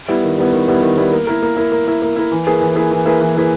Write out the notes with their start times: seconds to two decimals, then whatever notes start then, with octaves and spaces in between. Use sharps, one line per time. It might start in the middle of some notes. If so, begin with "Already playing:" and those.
0.08 G3 B3 E4
0.23 D#3
0.37 G3 B3 E4
0.53 D#3
0.68 G3 B3 E4
0.82 D#3
0.97 G3 B3 E4
1.12 A#3
1.27 E4 A#4
1.43 A#3
1.57 E4 A#4
1.72 A#3
1.87 E4 A#4
2.02 A#3
2.16 E4 A#4
2.32 E3
2.47 A#3 E4 G#4 B4
2.61 E3
2.76 A#3 E4 G#4 B4
2.91 E3
3.06 A#3 E4 G#4 B4
3.21 E3
3.35 A#3 E4 G#4 B4